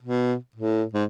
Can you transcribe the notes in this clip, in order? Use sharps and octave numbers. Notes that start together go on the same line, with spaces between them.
B2
A2
G#2